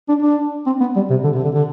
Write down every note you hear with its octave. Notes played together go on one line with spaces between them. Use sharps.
D4
D4
C4
B3
G3
C3
D3
C3
D3
D3